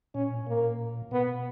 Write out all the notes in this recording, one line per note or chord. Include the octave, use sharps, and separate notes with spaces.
A#2 C#4
A#3
B2 B3